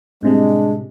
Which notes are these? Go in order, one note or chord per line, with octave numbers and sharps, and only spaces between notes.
A2 C3 G3 G#3 D4